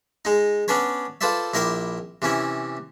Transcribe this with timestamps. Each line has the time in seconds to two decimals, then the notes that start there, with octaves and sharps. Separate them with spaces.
0.25 G#3 D#4
0.68 B3 C#4 D4 B4 C#5
1.21 F4 A4 B4 C5 D5 E5
1.54 A#1 E4 A#4 G5 C6 D6
2.22 C3 E3 C#4 E4